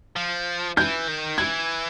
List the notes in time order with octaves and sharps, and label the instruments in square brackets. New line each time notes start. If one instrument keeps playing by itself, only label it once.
[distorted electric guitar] F3
[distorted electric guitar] E3 [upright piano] G6
[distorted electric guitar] D#3
[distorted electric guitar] E3 [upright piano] G#6